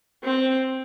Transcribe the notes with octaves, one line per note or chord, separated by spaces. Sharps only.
C4